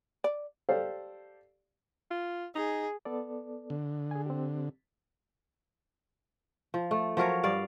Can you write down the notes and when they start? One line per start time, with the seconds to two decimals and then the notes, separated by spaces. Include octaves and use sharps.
0.24 D5
0.69 G4 A4 C5 D5 F5
2.11 F4
2.55 D#4 G#4
3.05 B3 A4 D5
3.70 D3
4.11 G#4 G#5
4.26 C4 G4
6.74 F3
6.91 A3
7.17 F3 F#3 A#4 C#5
7.43 G2 D5 F5